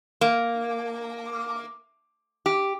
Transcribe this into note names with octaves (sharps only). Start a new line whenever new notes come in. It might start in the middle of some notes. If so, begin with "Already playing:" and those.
A#3
G4